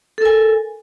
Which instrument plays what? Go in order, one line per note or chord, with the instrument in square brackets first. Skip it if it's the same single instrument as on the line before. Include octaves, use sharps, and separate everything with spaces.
[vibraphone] A4
A#4
G#5